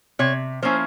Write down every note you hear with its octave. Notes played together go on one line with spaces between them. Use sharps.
C3 C#5
F3 A#3 C#4 E4 C5